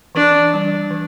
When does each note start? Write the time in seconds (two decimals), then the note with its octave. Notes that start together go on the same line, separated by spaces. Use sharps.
0.15 E3 D4
0.53 G3 D4
0.91 E3